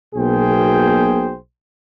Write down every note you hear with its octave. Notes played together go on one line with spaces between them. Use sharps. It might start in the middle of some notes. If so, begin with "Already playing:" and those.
B1 B2 A#3 G#4 C5 G5